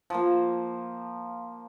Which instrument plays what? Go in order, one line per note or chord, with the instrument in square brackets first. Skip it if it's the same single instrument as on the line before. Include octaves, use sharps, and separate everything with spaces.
[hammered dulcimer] F3 A#3